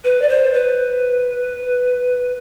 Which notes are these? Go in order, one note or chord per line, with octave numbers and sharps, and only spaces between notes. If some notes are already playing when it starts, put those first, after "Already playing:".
B4
D5
C5
B4